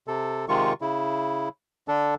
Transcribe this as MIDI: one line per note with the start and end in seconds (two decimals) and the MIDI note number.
0.08 0.45 48
0.08 0.45 69
0.49 0.73 48
0.49 0.73 51
0.49 0.73 56
0.49 0.73 65
0.49 0.73 85
0.81 1.49 49
0.81 1.49 64
1.88 2.15 50
1.88 2.15 62
1.88 2.15 69